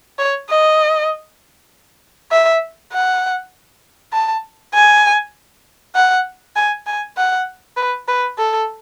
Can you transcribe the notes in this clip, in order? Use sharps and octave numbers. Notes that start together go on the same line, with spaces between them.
C#5
D#5
E5
F#5
A5
G#5
F#5
G#5
G#5
F#5
B4
B4
A4